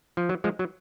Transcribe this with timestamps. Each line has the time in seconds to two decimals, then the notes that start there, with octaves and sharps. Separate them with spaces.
0.17 F3
0.29 F#3
0.44 F3 G#3
0.59 F#3